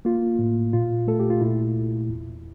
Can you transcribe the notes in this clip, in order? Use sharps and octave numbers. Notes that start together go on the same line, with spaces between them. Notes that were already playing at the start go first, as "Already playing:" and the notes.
A#3 F4
A2
A#2 F4
A3 A4
G4
F4
A#2 E4
C2
E2